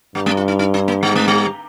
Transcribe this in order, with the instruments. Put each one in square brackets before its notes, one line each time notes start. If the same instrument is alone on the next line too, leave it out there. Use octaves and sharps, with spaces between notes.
[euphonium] G2 [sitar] G3
[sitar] G#3
F4
D#4
D#4
D4
A#3
[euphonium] G#2 [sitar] G3
[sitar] G#3
G3